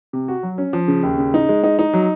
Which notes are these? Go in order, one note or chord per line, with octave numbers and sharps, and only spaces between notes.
C3
F#4
F#3
C#4
F3
C#3
D#2
C#3
D#4
G#3
D#4
D#4
F#3